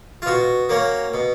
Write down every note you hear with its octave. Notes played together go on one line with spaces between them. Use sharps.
F4
B2 F#4
A#3 C#4
B2